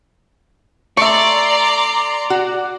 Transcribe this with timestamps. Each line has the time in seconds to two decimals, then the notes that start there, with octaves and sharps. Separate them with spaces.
0.97 A3 D5 E5 A#5 C6 C#6
2.30 F#4